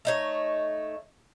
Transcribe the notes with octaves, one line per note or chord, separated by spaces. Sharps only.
A3 D#4 C#5